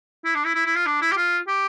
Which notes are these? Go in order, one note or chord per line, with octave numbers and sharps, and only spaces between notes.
E4
D4
E4
E4
E4
F4
D4
E4
G4
F4
G4